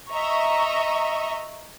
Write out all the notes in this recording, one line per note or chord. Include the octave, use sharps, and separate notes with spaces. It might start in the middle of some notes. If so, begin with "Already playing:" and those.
D#5 E5 A#5 C#6